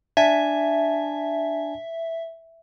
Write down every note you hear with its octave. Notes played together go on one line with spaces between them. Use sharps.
D4 E5 G#5 A5